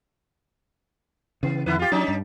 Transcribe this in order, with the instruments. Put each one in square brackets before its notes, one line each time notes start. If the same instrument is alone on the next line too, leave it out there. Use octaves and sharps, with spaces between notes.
[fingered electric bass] C#3 E3 [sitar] B3
[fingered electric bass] F2 [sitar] D3 E4 B4
[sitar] F4 G4
[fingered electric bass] F#3 [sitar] G3 C#4 D#4
[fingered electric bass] G2